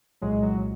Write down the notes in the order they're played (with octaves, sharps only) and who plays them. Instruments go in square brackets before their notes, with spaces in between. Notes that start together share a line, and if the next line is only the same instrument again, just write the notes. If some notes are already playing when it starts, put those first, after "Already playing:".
[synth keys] C2 A#2 F#3 G#3
F#3